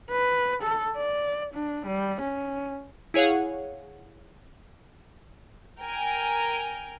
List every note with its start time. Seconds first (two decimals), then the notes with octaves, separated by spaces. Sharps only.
0.11 B4
0.63 A4
0.97 D5
1.54 D4
1.87 G3
2.21 C#4
3.14 E4 G#4 C#5 F5 F#5
5.81 A#4 G5 G#5